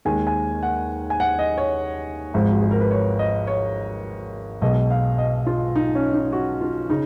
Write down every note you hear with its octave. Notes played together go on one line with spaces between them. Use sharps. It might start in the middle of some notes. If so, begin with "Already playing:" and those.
D#2 D#3 G#3 G#5
G#5
F#5
G#5
F#5
D#5
C#5
G#1 G#2 F3 G#3
F#4
G#4
A#4
B4
C#5
D#5
C#5
B1 B2 G#3 D#5
F5
D#5
F4
D#4
C#4
D#4
F#4
F4
C#3 D#4